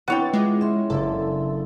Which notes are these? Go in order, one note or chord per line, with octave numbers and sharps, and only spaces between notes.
B3 C4 D4 E4 F#4 C#5 G5 A6
G#3 F4 D6
C#4 E5 C6
F#1 D4 A4